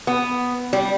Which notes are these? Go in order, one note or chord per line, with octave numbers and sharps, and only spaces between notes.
B3
G3